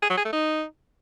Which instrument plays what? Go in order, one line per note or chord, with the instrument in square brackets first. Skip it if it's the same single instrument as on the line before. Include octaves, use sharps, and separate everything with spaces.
[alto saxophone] G#4
F#3
G#4
A3
D#4